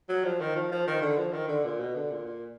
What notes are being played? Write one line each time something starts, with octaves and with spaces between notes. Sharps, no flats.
F#3
F3
D#3
F3
F3
D#3
D3
F3
D#3
D3
A#2
B2
D3
A#2
A#2